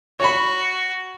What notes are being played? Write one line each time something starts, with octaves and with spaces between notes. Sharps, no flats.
F#4 C#5 B5